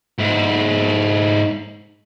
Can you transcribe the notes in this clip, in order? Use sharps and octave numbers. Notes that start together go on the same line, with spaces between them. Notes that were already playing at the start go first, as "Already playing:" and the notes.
G#2 E4